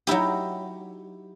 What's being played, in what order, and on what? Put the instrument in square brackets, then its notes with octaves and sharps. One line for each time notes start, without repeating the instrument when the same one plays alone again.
[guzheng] F#3 D#4 E4 G4